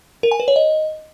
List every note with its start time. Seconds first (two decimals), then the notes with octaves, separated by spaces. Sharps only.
0.23 A#4
0.31 G#5
0.40 B4
0.48 C#5
0.56 D#5